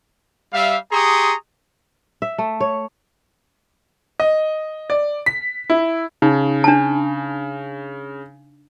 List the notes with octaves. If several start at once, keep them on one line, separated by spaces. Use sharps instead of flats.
G3 E5 F5
G4 G#4 A#5 C6 C#6 D#6
E5
A3
C#5
D#5
D5
B6
E4
C#3 D#4
D4 A5